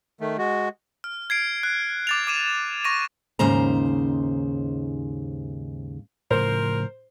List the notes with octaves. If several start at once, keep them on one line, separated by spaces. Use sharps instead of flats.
D#3 A3
G#3 F#4
F6
G#6 C7 D7
F#6
D6 A6 F7
D6 D#7 E7
C#6 A#6 D#7
D#2 G#2 C#3 C5 A#5
A2 C#3 F3 A#4 C5